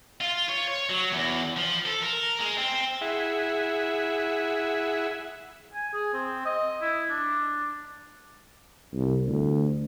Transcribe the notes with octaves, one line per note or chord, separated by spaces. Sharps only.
F4
C#5
C#5
F#3
E2
F3
A4
A#4
G#3
C4
E4 G#4 E5 F#5
G#5
G#4
C4
D#5
E4
D4
C2
D2